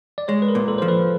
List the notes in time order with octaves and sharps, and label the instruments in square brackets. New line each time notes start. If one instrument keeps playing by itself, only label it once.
[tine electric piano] D5
[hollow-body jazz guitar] G#3 [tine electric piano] C#5
[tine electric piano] B4
A#4
[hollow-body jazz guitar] A#2
[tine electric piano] A4
[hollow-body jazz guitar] F3 [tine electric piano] C5
[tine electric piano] B4